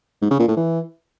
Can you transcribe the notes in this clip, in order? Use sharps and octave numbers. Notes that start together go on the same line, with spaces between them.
G#2
C#3
A#2
A2
E3